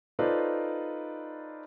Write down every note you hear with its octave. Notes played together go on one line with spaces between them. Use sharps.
D#4 F4 A4 B4 C5 D5